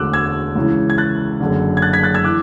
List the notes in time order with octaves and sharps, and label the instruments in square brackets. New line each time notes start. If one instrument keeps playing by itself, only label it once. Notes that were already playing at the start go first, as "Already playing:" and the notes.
Already playing: [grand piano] E1 D2 D3 D6 E6 F#6
E6 G#6
C#2 C#3 E3
G#6
F#6 A6
F#1 F#2 D3
G#6
F#6 A6
G#6 B6
F#6 A6
E6 G#6
E3 D6 F#6